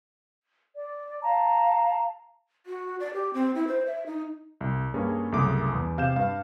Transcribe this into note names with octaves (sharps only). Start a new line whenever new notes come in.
D5
F5 A5 A#5
F#4
D5
G4
C4
E4
C5
E5
D#4
C2
G2 A#3 C#4 G#4
C2 F#2 C#3 A3 D6 D#6
E2
C3 F5 G6 E7
G2 F5